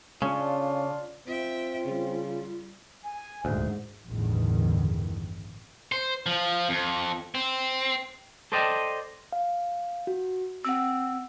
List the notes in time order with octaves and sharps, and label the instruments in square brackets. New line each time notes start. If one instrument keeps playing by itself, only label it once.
[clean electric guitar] C#3 [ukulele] C#4 [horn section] D4 F4
[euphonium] C4 [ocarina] F4 [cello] E5 G5
[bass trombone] C#3 [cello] G3
[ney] G#5
[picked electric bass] D#1 D2 [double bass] G#2 [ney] C5
[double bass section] A1 E2 G2 D3 D#3
[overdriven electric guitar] C5
F3
F2
C4
[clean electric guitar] A4 C5 D5 D#5 G5 A5
[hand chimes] F5
F#4
[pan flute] C4 [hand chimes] F#5 E6